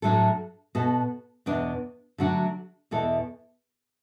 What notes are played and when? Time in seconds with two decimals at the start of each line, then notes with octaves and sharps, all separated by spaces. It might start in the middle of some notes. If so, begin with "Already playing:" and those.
0.02 A2 F#3 A3 D4 A4
0.75 B2 B3 F#4 A4
1.46 E2 B2 B3 D4
2.18 D3 F#3 A3 D4 F#4
2.91 E2 B2 B3 E4 A4